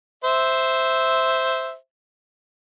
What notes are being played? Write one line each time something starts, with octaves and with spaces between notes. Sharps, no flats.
C5 E5